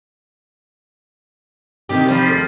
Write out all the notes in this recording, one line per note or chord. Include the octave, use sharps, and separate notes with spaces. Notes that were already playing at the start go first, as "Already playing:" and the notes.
C3 D#3 D#4 G4
F3 G3
D#2 G#3 A3